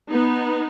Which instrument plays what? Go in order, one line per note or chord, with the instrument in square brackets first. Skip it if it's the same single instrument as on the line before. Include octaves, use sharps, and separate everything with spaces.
[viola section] B3 D#4